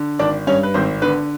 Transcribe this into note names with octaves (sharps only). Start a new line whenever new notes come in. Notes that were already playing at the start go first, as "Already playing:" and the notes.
Already playing: D3
G#1 D4 D5
G2 C#4 C#5
B4
G#1 C4 C5
D3 B3 B4